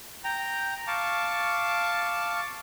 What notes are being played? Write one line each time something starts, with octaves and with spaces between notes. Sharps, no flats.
G5 A#5
F5 A5 C#6 D6